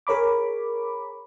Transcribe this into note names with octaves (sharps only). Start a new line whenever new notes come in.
G#4 A#4 C#5 B5 D6